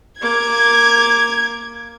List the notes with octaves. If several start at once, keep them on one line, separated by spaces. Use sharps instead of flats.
A#3 D6 G#6